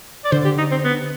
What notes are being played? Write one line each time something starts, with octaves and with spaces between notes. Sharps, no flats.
D5
D3 C5
G4
D#4
C4
B3